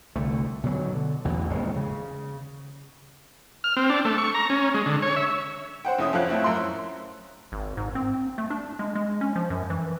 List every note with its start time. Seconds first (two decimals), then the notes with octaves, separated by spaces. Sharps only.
0.16 C2 D3 A3
0.64 B2 D3 F3 F#3
0.93 D3
1.24 A1 E2 B2 E3
1.50 D#1 G#1 C#3 G#3
1.76 C#3
3.64 F6
3.77 C4
3.90 D4
4.05 A3
4.18 C#6
4.34 A#5
4.50 C#4
4.74 G#3
4.86 D3
5.02 C#5
5.16 E5
5.85 C5 F#5 G5
5.99 F1 C#4 E4 D#6
6.13 F2 F3 C#4 F5 F#6
6.29 A3 C4 E4
6.44 F#2 C6
7.52 G#1
7.77 G#2
7.95 C4
8.38 A3
8.50 D4
8.79 G#3
8.95 G#3
9.21 C#4
9.36 F3
9.50 F#2
9.70 E3